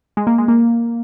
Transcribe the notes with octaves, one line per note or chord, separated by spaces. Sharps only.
G#3
A#3
G#3
A#3